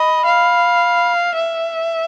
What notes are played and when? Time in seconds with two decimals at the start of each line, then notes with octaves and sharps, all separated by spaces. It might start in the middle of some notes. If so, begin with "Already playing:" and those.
Already playing: D#5 B5
0.25 F5
1.35 E5